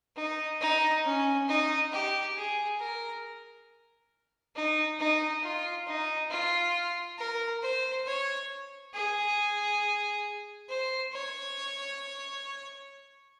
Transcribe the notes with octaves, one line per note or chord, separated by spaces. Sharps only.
D#4
D#4
C#4
D#4
G4
G#4
A#4
D#4
D#4
F4
D#4
F4
A#4
C5
C#5
G#4
C5
C#5